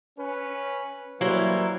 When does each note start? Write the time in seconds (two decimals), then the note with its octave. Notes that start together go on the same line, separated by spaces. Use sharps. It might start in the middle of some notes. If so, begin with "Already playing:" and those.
0.19 C#4 B4
1.21 E3 F#3 G3 A#3 E4 C5